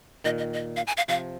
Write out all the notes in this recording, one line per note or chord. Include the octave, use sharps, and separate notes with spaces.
A#2 D#3 D#5
D#5
D#5
F5
G#5
F5
C3 F3 F5